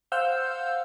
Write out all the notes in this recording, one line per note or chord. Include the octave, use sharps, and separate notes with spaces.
C5 F5 F#5 E6 F6 G6